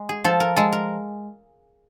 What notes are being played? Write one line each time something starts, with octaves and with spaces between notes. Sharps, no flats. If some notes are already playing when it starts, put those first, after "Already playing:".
Already playing: G#3
G#4
F3 A4
A#4
G#3 A4
A#4